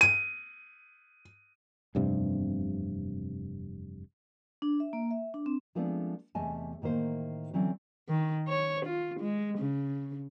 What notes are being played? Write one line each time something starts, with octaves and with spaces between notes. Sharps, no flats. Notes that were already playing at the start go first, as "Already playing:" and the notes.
D#7
F1 E2 G2 C3
D4
E5
A#3
E5
D4
C4
F3 G#3 A3 B3 C4 D4
E2 C3 A3 D#5 G#5 A5
A2 D#3 A#3 C5
D3 E3 F#3 C4 C#4
D#3
C#5
F4
G#3
C#3